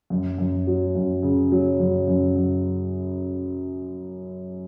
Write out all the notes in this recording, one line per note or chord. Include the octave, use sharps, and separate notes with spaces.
F#2
F#2
F#3
F#2
C#3
F#3
F#2
F#2
F#2